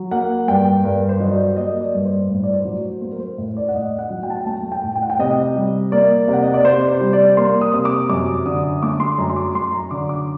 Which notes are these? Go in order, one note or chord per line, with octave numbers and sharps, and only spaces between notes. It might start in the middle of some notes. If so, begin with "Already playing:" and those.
Already playing: F#3
A#3 F#5
G2 G5
G2 A#4
C5
F#3 D#5
D5
A#3 D#5
D5
G2
C5
A2
D5
C5
F#3
A3 C5
A#4
C5
A2
D5
F#5
A2 D#5
F#5
F#3
G5
A5
G5
A3 A5
G5
A2
G5
F#5
G5
C3 D#5
G3
A#3 D5
C3
F#5
D#5
D5
C3 C5
C5
G3
D5
A#3 C6
D#6
C3
D6
F#2 D6
D3 D#6
A3 D6
C6
F#2 A#5
C6
D6
F#2 C6
A#5
D3 D6
D6